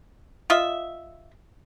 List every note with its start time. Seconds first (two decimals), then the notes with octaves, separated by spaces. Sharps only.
0.50 F4 D#5 E5